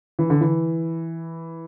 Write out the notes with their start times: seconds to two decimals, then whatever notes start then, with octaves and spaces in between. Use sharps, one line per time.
0.19 E3
0.30 D3
0.41 E3